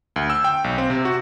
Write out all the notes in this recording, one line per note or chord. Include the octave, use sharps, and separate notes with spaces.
D2
E6
G5
B1
C4
C3
F#4